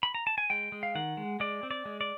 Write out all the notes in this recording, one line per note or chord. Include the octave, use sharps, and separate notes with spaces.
B5
A#5
A5
G#5
G#3 G5
G#3
F5
D#3 F#5
G#3
G#3 D5
C4
D5
G#3
D5